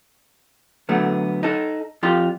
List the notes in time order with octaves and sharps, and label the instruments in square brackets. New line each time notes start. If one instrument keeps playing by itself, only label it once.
[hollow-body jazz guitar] D3 F#3 A3 B3
D#4 A4
F2 F4 G4 C6